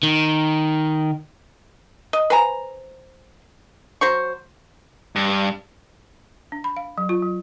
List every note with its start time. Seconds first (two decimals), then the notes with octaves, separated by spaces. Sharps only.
0.03 D#3
2.13 D#5
2.30 B4 C5 G#5 A#5
4.01 F#3 C5 C#6
5.16 G2
6.52 D4
6.64 B5
6.77 F5
6.98 F#3
7.09 F4
7.22 F#3